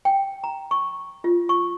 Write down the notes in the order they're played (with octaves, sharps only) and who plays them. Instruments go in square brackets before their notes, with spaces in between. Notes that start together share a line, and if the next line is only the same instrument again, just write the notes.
[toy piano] G5
A#5
C#6
F4
C#6